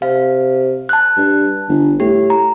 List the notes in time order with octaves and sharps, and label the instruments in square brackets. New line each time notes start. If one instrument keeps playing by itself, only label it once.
[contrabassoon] C3 [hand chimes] F5
[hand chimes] A5 F#6
[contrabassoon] G2
G1
[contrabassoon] A2 [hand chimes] G4
[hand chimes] A#5